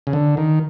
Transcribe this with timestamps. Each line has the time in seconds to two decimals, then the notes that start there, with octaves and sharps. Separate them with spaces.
0.07 C#3
0.13 D3
0.37 D#3